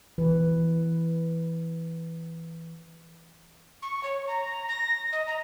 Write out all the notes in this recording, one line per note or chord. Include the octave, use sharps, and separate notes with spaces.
E3 B4
C#6
C#5
A#5
A#6
D#5
A#5